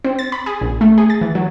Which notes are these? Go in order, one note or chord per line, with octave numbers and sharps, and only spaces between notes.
C4
A6
B5
G#4
A#1
A3
G#4
A6
E3
F#3